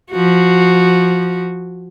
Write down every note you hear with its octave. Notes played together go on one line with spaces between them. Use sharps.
F3 F#4